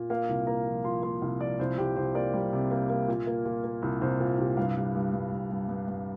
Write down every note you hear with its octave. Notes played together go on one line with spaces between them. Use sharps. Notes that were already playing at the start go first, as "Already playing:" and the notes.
Already playing: A#2
A#3 F5
C2
A#3 A#5
F3
F3 C6
A#3 C6
C2 F5
F3 D5
C2 C5
C2 G4
C2 C5
A#3 D5
G3
C3
A#3
A#3
A#2
A#3
A#2
A#3
C2
C2 C5
A#2
C2 G4
G2 F5
G3
G2
G2
G2
G2
G2
G2